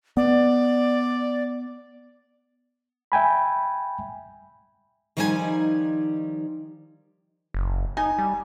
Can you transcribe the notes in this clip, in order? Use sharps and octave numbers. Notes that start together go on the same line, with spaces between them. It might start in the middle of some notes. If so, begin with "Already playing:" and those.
B3 D5
E5 G5 G#5 B5
D#3 F3 G3 D#4 E4 G#5
F#1
D#4 G#5
G3